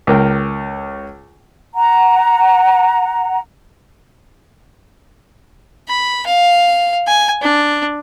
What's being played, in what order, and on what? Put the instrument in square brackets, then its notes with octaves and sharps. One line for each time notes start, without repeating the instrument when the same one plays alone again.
[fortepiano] C#2 A#4 G5
[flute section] F#5 A#5
[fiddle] B5
F5
G#5
D4